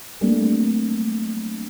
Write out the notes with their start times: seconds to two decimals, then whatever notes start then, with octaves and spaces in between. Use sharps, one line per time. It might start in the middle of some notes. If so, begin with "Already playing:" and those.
0.21 F#3 G3 A3 A#3 C4 D4